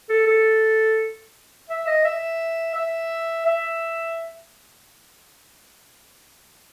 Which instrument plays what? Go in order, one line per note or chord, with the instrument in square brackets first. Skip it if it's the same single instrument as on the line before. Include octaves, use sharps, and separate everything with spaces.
[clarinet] A4
A4
E5
D#5
E5
E5
E5